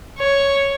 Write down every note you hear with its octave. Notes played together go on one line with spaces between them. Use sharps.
C#5